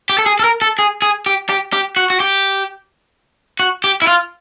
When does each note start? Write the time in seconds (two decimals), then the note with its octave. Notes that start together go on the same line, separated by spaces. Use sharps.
0.10 G4
0.19 A4
0.26 G#4
0.39 A4
0.44 A#4
0.62 A4
0.79 G#4
1.02 G#4
1.26 G4
1.49 G4
1.73 G4
1.96 F#4
2.10 F#4
2.20 G4
3.60 F#4
3.84 G4
4.02 E4
4.07 F4